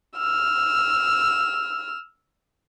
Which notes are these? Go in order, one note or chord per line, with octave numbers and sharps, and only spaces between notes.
E6 F6